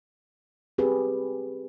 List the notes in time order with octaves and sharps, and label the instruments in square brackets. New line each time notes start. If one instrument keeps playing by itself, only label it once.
[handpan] C4 G4 G#4 B4